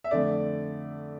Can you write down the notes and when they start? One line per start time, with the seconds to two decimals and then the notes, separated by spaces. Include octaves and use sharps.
0.04 E5
0.11 F2 D3 A3 D5